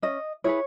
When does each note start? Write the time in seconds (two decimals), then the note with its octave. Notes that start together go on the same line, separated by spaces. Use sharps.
0.02 C#4 D#5
0.44 E4 G#4 B4 C#5